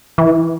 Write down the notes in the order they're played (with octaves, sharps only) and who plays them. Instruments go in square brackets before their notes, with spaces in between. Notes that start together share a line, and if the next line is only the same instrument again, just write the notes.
[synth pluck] E3